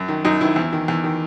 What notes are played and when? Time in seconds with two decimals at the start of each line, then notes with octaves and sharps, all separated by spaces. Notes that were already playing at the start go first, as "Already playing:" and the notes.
Already playing: F#2
0.08 D#3
0.25 F#2 D#4
0.41 D#3 E4
0.56 E2
0.73 D#3
0.88 E2
1.04 D#3